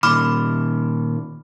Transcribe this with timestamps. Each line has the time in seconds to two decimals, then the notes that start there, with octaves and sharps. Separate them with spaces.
0.03 A#2 D#3 B5 D6 F6